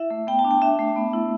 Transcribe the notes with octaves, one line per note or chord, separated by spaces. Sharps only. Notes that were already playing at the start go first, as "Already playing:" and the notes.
Already playing: E4 E5
A3
B3 G5
A5
D4
G5
D4 E5
A3
B3
E4